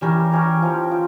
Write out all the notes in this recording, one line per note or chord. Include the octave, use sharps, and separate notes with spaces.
E3 G3 C#4 G4 A#4
G3 C#4 G4 A#4
F3 C#4 G4
F3